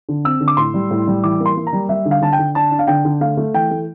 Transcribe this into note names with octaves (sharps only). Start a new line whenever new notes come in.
D3
C4 E6
D3
D6
A2 C6
G3
A2
G3
E3 D6
A#3
C6
A#3
A#5
G3
G3 E5
D3
F5
D3 A5
G5
D3
D4 A5
D4
F5
D3 G5
D3
A3 F5
A3
E3 G5
A3